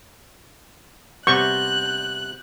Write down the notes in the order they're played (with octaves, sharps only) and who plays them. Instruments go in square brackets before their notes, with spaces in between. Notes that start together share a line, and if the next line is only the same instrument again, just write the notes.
[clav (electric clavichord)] C3 G3 B3 [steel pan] C#6 [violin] F#6 [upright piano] G6